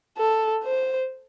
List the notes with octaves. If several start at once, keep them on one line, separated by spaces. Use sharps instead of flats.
A4
C5